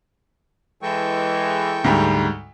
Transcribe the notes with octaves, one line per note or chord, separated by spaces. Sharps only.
E3 G#3 A4 G5 C#6
D2 G#2 G3